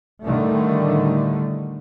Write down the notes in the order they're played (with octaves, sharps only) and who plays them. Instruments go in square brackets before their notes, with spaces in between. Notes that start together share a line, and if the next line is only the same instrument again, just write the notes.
[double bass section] A2 D3 D#3 G3 A3